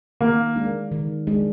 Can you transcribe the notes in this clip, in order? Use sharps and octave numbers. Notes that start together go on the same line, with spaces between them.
D#3 A#3
G#3 D4
D#3
G#3 D4